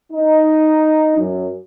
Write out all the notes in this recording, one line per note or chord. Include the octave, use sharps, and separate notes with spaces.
D#4
F#2